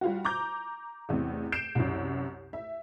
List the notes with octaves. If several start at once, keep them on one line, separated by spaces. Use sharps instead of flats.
G3 F4 F#4
A#5 D6 G6
A1 E2 C3
G6 C7 D7 E7
C2 F#2
E5